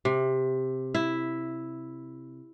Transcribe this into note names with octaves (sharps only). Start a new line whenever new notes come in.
C3
E4